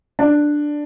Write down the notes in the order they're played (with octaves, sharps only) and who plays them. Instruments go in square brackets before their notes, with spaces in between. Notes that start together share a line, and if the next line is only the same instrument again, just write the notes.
[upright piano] D4